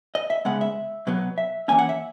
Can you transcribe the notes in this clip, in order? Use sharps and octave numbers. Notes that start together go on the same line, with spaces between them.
D#5
E5
C#3 G#3 B3 F#5
E5
B2 F#3 B3
E5
E3 A#3 C#4 G#5
F#5
E5